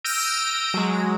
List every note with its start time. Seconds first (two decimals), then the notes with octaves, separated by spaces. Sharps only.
0.04 E6 F6 G6 A#6 D7 D#7
0.74 F#3 G#3